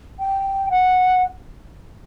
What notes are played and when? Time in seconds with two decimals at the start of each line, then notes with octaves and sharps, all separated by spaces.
0.20 G5
0.70 F#5